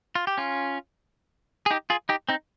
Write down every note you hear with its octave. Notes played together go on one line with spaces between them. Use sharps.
F4
G4
C#4 F4
G#4
D#4 G4
F4 G#4
D#4 G4
C4 D#4